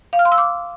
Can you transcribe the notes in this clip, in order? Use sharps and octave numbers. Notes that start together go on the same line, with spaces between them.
F5
F6
C6
E6
D6